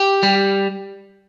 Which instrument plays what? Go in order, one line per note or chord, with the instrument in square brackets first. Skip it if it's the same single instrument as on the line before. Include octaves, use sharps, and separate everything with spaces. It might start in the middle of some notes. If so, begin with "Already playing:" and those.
Already playing: [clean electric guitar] G4
G3